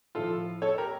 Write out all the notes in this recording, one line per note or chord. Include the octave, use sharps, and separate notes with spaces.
A2 F3 F4 A4
A4 C#5
G4 A#4